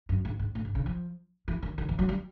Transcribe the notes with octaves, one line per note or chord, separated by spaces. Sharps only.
F#2
G#2
G#2
A2
G#2
C#3
F3
E3
D#3
D#3
E3
F#3
G3